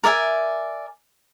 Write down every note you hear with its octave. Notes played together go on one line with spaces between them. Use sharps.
A#4 D5 E5 G#5